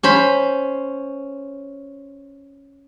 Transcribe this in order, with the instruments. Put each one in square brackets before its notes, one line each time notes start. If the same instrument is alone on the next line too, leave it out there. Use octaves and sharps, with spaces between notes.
[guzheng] C#4 C5 B5